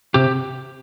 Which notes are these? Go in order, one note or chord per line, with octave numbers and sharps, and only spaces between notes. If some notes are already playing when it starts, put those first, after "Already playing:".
C3 G4